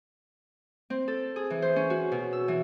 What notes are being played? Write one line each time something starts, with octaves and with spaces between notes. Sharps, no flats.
C4
A4
G#4
E3
C5
C#4
F#4
B2
E6
E3